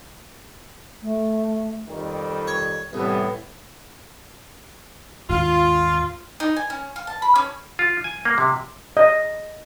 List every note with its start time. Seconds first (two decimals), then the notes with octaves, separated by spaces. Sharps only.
1.02 A3
1.88 F2 D#3 G3
2.47 C#5
2.93 C2 A2 E3 B3
5.29 D#2 G#2 D4 F4
6.40 D#4
6.56 G#5
6.70 C#4
6.96 F5
7.07 A5
7.22 B5
7.36 C#4
7.79 F4
8.04 G#5
8.25 A#3
8.38 C3
8.97 D#5